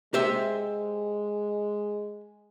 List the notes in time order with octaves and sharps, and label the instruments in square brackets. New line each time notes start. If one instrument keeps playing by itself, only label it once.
[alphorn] G#3 [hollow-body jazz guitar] G4 C5 E5